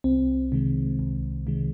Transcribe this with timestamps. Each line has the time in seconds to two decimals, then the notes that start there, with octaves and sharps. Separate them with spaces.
0.04 C2 C4
0.52 C3 D#3 G#3
0.99 C2
1.47 C3 D#3 G#3